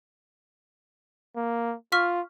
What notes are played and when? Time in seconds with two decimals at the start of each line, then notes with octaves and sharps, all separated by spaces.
1.36 A#3
1.92 F4 C#6 F6 B6